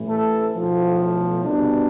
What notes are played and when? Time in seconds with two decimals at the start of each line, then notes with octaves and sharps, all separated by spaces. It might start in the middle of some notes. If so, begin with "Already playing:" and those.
Already playing: A1 A2 E3
0.08 A4
0.53 B1 A2 F3
1.43 C2 B2 D4